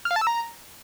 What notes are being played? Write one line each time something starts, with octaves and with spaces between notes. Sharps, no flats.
F6
F5
A5
E6
A#5